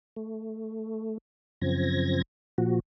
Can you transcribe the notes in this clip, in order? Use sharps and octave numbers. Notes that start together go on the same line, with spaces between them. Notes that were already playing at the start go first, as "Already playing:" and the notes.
A3
F#2 C#3 F3 C4 G#6 A#6
A#2 F3 F#4